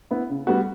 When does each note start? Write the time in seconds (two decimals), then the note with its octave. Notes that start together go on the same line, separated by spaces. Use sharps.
0.11 B3 E4
0.30 C#3
0.47 G3 B3 F#4